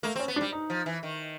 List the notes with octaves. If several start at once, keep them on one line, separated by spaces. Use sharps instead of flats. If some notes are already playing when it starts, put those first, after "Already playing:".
A3 A#3
C4
C#4
B3
D4
G3
D#4
F3
E3
D#3